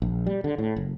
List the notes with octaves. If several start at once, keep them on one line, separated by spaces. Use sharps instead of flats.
A#1
G3
D3
A2
F#1